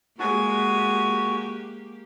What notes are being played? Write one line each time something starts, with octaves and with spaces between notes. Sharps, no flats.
G#3 A#3 F#4 G4 G#5